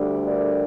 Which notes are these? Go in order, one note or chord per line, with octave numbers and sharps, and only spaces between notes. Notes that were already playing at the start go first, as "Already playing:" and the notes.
Already playing: D2 D3 G3
A#4 D5